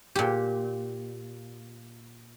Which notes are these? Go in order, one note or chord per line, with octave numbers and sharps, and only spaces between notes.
A#2 G4